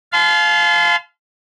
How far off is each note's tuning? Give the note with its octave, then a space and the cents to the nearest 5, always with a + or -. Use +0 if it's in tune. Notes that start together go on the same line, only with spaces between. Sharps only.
F5 +0 A5 -40 C6 -35